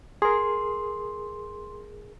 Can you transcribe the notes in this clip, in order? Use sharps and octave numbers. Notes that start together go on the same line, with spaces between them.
G#4 A#4 C6